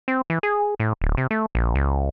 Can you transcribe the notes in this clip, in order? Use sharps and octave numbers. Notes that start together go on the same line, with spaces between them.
C4
E3
G#4
A2
D1
C3
A3
A#1
C#2